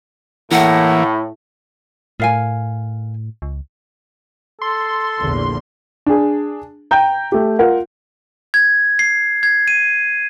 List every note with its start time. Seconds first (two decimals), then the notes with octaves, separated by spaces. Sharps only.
0.51 A2 E3 A#3 E4 F#5
2.20 A2 A#4 F5 G#5
3.42 C#2
4.62 A4 C6
5.22 A#1 E2 D3
6.06 D4 G#4
6.91 G5 A#5 G6
7.32 A3 G4
7.59 F4 A#4 F#5
8.54 G#6
8.99 C7
9.43 G#6
9.68 D#7